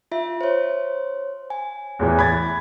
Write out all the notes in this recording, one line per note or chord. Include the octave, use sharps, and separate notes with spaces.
F4 E5
C5 C#5
G#5
E2 A2 E3
B5 G#6 A6